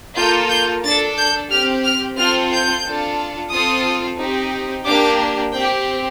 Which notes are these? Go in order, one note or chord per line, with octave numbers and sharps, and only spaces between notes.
A#3 F4 A4 G6
G6
D4 A4 A6
G6
C4 G4 F6
F6
C4 F4 A4 F6
G6
D4 F4 A4
C4 F4 A4 D#6
C4 D#4 G4
A#3 D4 G4 D6
C4 G4 G5